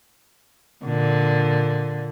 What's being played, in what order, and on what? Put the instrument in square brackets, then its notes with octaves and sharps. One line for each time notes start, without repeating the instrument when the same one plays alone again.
[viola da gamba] A#2 D3